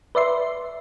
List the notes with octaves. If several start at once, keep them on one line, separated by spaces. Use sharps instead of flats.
B4 D5 E5 C6